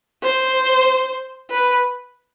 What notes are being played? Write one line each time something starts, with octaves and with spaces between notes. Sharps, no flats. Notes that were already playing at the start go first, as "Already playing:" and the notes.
C5
B4